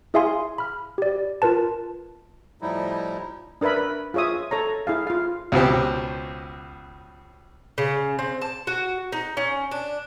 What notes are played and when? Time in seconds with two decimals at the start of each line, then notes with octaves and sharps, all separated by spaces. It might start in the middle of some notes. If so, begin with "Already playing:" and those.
0.14 E4 G#4 E5 F5 G#5 C6
0.58 B5 F6
0.98 G4 D5
1.42 F4 A#4 B4 A5
2.62 A2 F3 G3 D#4 E4
3.61 D4 A#4 B4 E5 B5
3.76 B4
4.14 F4 G#4 C#5 E5 D#6
4.51 A4 C#5 A#5
4.87 E4 G#4 F5
5.07 F4 F5
5.52 C#2 B2 C4 G4
7.78 C#3
8.19 C4
8.42 A5
8.67 F#4
9.12 D#4
9.37 C#4
9.71 D4